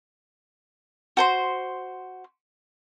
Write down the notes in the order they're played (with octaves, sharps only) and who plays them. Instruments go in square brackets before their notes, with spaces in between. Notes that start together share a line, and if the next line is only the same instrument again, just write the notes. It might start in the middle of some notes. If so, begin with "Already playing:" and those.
[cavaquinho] F#4 C5 C6